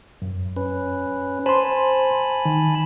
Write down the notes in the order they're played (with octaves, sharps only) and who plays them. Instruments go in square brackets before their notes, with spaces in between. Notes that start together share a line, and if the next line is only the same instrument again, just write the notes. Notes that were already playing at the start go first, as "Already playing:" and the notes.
[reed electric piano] F#2
[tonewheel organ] C#4 B4
[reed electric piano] C5 C6 [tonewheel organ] G#5 A5 B5
[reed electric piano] D#3